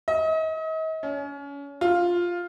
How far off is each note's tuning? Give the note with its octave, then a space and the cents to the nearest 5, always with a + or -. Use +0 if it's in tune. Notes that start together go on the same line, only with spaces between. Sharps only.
D#5 +40
C#4 +30
F4 +5